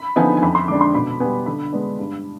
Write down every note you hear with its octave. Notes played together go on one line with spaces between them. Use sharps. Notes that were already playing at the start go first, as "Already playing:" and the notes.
Already playing: B5
D3 F3 B3 D#4 G#5
G#5
F2 B5
C6
D3 G#3 D4 D6
C6
B2 B5
G3 B3 G#5
D3 B5
G#3 B3 D4
G2